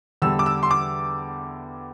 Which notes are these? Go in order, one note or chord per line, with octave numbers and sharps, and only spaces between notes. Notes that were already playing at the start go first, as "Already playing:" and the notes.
E2 D3 G3 E6
D6
E6
C6
D6